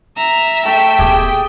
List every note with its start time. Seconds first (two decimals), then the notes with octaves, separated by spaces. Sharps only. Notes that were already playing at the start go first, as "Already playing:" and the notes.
0.17 E5 A#5
0.65 A3 A4 G5
0.99 D#1 B3 G4 G#4